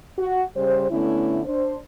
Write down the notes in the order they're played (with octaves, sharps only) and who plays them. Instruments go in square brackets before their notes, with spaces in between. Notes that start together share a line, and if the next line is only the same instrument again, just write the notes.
[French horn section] F#4
C#3 G3 C5
D3 A3 B3 C#4 E4
D4 C5